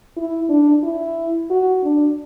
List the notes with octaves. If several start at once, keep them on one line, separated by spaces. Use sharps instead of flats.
E4
D4
E4
F#4
D4